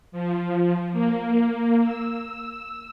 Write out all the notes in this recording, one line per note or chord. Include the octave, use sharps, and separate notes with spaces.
F3
A#3
E6